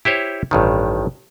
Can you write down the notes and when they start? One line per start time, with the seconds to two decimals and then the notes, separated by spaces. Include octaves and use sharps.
0.05 E4 G4 C5 C#5
0.51 A1 G2 D#3